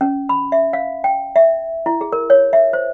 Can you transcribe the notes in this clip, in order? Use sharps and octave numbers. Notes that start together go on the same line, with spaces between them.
C#4
B5
E5
F5
G5
E5
E4
G#4
A#4
C#5
E5
C5